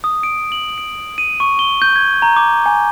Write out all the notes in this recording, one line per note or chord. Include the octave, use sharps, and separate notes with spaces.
D#6
D7
F#7
D7
D#7
C#6
G7
G6
G#6
A#5
D6
G#5